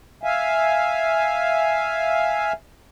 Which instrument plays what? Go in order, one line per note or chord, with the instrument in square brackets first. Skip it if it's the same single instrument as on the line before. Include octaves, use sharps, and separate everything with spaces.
[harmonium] E5 F5 G#5